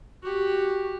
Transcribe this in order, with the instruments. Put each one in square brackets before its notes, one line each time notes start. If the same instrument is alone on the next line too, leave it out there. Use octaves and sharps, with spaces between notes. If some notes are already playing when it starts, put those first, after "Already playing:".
[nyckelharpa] F#4 G4